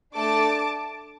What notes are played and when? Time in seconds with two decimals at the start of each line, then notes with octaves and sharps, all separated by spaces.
0.14 A3 D4 A4 A5 D6